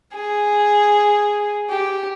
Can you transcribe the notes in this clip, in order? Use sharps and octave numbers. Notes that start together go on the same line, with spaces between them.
G#4
G4